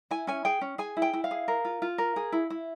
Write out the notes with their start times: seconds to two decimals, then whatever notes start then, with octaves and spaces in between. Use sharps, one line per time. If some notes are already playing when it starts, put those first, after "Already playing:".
0.11 E4 G#5
0.27 C#4 G#5
0.45 G#4 G5
0.61 C#4
0.78 G#4 G#5
0.97 E4
1.02 G5
1.13 E4
1.24 F5
1.31 G#4
1.48 A#4
1.65 F4
1.82 F4
1.98 A#4
2.16 G#4
2.32 E4
2.50 E4